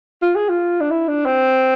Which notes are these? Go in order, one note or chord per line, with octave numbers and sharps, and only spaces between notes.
F4
G#4
F4
D4
E4
D4
C4